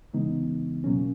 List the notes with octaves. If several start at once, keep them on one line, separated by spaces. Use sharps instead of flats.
C#3 E3 G#3 B3 D#4
B2 F#3 A#3 C#4